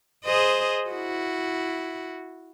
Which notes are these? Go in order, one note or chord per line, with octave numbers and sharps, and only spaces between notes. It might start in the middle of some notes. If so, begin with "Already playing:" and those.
G#4 C5 D#5
E4 F#4